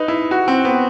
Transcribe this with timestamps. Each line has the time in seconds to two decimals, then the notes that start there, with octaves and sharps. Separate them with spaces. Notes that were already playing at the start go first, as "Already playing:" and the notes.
Already playing: D#4 B4
0.08 E4
0.31 F#4
0.48 C4
0.65 B3